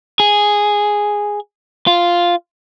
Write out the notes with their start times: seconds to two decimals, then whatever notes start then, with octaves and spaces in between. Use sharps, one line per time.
0.20 G#4
1.87 F4